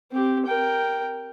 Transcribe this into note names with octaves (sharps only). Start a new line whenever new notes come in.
C4 G4
A#4 G5